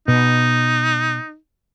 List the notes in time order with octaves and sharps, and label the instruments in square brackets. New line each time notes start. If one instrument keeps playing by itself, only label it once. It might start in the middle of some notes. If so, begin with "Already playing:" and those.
[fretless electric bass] B2 [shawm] D#4